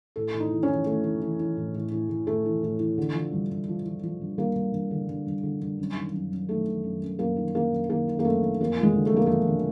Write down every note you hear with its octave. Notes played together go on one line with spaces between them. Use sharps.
A2 A4
A2
D#4
E3
C#4
E3
E3 A3
E3
E3
E3
A2
A2
A2
A2
A2 A3
E3
A2
E3
D3
F3
G2
G2
F3
F3
F3
G2
G2 A#3
G2
G2
D3
G2
G2
D3
G2
F#2
D#3
F#2
F#2
D#3 A3
D#3
F#2
F#2
F#2 A#3
D#3
F#2 A#3
F#2
D#3 A#3
D#3
A#3
F#2 A3
D#3
F2 A#3
F3 G#3
D3
A3
F2 A#3
F3 A3
D3